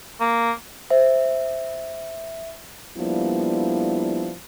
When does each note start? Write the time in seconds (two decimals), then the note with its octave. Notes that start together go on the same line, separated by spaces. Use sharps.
0.20 A#3
0.90 C5 E5
2.98 F3 G3 A#3 B3 D4 E4